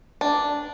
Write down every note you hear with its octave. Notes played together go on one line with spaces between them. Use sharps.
D4